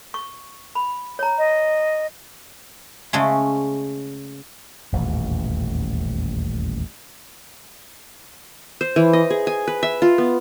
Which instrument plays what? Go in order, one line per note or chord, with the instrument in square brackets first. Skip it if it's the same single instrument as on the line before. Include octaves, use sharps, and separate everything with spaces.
[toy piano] C#6
B5
C#5 A#5
[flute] D#5
[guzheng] C#3 G#3 A3 C#4
[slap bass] D#1 A1 E2 B2
[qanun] C5
E3
D#5
G#4
G#5
B4
E5
F4
B3